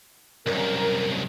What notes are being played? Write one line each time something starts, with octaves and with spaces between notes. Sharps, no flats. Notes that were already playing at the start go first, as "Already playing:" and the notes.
C2 F#2 A#4